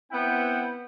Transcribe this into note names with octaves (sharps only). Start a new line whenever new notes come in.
B3 C4 E4 B4 F#5 G5